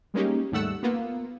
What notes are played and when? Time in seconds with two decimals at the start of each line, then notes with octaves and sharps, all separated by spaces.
0.14 G3 G#3 A#3 C#4 D#4 G4
0.52 D#2 G#2 G3 A3 F#5 E6
0.83 A#3 B3 F4